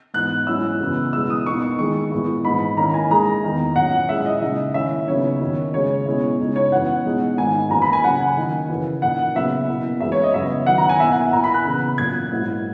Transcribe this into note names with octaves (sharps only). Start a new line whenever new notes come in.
G#2 E3 B3 D#4 F#6
G#2 F#3 C#4 E4 E6
F#2 C#3 E3 B3
B2 G#3 B3 E4 E6
D#6
B2 A#3 D#4 C#6
C#6
D#3 G#3 D#4 C#6
A#2 G#3 B3 E4
G#2 E3 G#3 D#4 B5
D#3 A#3 C#4 E4 A#5
G#5
D#3 G#3 D#4 A#5
E2 D#3 A#3 E4
A#2 F#3 C#4 F#5
A#2 G#3 C#4 E4 E5
D#5
C#3 G#3 D#4 E5
D#3 A#3 C#4 E4 E5
C#3 F#3 B3 D#4 C#5
F#2 D#3 A#3
F#2 C#3 G#3 C#5
B2 G#3 C#4 E4
C#3 G#3 D#4
C#5
F#2 E3 B3 E4 F#5
B2 G#3 D#4
G#2 D#3 A#3 D#4 G#5
F#2 E3 A#3 A#5
B5
G#5
C#3 F#3 C#4 F#5
G#5
D#3 A#3 D#4
F#2 C#3 E3 A#3 E4
A#2 A#3 D#4 F#5
C#3 F#3 B3 E5
B2 A#3 E4
F#2 E3 G#3 E5
C#5
D#5
F#2 C#3 F#3 B3 E5
D#3 F#3 B3 F#5
A#5
G#5
B2 A#3 E4 E5
F#5
G#5
A#2 A#3 E4 A#5
B5
F#6
C#3 E3 B3
A#2 F#3 A#3 G#6
G#2 F#3 A#3 E4